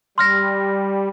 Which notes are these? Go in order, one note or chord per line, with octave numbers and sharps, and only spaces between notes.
G3 C6 F6 A#6